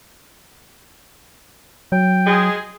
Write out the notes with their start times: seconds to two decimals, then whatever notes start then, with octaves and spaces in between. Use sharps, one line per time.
1.92 F#3 G5
2.26 G#3 G#4